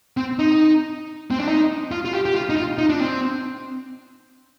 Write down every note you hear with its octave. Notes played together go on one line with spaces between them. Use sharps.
C4
D#4
C4
D4
D#4
F4
F4
G4
G4
F4
D#4
F4
D#4
D4
C4